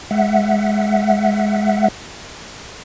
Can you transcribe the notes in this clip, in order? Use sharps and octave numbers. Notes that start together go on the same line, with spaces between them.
G#3 E5 F#5